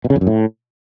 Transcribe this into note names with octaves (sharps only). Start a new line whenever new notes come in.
B2
C#3
F2
F#2
A2